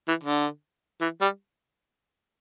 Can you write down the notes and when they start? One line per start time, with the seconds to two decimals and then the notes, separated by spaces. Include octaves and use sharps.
0.08 E3
0.23 D3
1.01 E3
1.21 G3